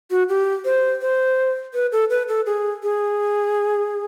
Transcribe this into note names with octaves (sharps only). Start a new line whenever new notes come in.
F#4
G4
C5
C5
B4
A4
B4
A4
G#4
G#4